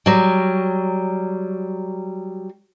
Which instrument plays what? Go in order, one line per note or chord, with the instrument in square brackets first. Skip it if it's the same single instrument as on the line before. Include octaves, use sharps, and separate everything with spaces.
[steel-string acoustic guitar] F#3 G3